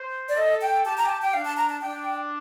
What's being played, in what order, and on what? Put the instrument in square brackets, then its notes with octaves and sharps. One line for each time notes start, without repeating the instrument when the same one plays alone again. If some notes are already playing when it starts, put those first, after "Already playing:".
Already playing: [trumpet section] C5
[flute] D5
[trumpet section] A4 [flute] D#5
[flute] G5
[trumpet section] G4 [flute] A5
[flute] A#5
G5
A5
G5
[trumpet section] D4 [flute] F5
[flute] A5
A#5
A5
[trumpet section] D4 [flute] G5